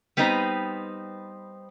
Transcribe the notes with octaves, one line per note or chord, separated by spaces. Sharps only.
G3 B3 C4 D#4 B4 C5